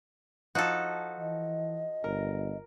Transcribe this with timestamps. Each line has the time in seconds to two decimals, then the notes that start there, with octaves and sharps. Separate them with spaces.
0.55 F3 D#4 F#4 A4
1.19 E3 D#5
2.04 G1 A#4